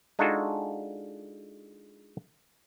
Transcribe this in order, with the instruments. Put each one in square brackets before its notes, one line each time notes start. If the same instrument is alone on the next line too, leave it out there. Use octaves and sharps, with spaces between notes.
[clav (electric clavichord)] G#3 D4 D#4 F4 F#4 A4